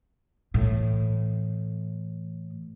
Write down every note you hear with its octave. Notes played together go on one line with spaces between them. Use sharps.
A2 E3